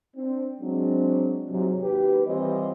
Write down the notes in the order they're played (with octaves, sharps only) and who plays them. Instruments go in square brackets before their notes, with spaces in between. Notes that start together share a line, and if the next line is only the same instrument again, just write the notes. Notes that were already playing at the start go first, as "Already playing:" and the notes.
[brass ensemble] C4 D4
F#3 G#3 C4 D4
G#2 C3 F#3
D#2 G4 B4
E3 G3 C4 F4 C#5 D#5